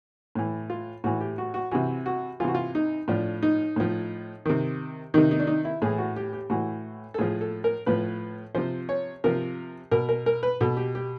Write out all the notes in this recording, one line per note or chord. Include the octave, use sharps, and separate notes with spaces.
A2 E3
F4
A2 E3 F#4
G4
F#4
F#4
C3 E3 F#4
F#4
C3 E3 F4 F#4
F4
D#4
A2 F3 D4
D#4
A2 F3
C3 D#3
C3 D#3 D#4
D#4
D4
D#4
E4
A2 E3 G#4
F#4
G4
G4
A2 E3 F#4
A4
A2 F3 G#4
A4
A#4
A2 F3 B4
C3 F3 C5
C#5
C3 F3 A#4
B2 A#4
A#4
A#4
B4
B2 A4
G4
G4